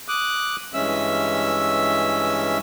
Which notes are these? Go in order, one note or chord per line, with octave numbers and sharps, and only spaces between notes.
D6 D#6 F#6
G2 E3 G#3 C#4 E5 E6